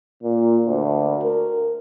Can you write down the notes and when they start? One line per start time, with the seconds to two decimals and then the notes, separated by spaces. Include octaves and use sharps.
0.23 A#2
0.66 D2
1.23 A#4